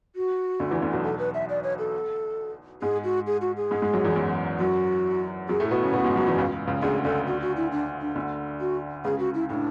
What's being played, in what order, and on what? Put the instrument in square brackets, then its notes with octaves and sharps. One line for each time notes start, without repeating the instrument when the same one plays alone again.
[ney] F#4
[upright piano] D2 D3
E2 E3
D2 D3
B1 B2
[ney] A4
B4
E5
D5
C#5
A4
[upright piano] G#2 G#3 [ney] G#4
[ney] F#4
G#4
F#4
G#4
[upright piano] G#2 G#3
G#2 G#3
F#2 F#3
E2 E3
F#2 F#3
[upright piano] F#2 F#3 [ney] F#4
[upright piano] F#2 F#3 [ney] G#4
[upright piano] A2 A3
[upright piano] B2 B3 [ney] F#4
[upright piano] C#3 C#4
B2 B3
G#2 G#3
F#2 F#3
E2 E3
C#2 C#3
C#2 C#3
[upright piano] D2 D3 [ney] G#4
[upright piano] D2 D3 [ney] A4
[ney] F#4
F#4
E4
D4
D4
[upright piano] D2 D3
[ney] F#4
[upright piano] C#2 C#3 [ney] G#4
[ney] F#4
E4
[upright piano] A2 [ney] E4
[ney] D4